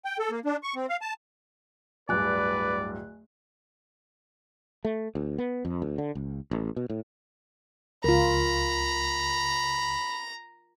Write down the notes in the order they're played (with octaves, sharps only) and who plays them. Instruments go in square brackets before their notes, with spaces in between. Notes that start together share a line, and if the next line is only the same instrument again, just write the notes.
[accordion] G5
A4
A#3
D4
C#6
C4
F5
A5
[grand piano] D1 G2 [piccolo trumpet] B4 [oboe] D5 [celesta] G#5 F#6
[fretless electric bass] A3
D2
B3
F2
D2
D3
C#2
A1
B2
A2
[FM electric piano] C#2 [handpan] F4 A#4 [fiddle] A#5 [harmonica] B5